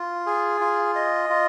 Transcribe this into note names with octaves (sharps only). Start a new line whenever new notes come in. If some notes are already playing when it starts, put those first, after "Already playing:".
Already playing: F4
G#4
F4
D#5
F4